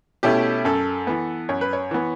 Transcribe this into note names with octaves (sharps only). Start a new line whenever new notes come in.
B2 A3 C#4 E4 G4
F#2 A4
E3 B3
F#2 C#5
B4
C#5
E3 B3